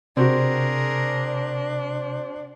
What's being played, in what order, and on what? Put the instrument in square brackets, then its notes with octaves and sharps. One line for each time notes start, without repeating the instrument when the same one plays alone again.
[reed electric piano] C3 [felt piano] C4 F#4 [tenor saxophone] D4 [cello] G#4 A#4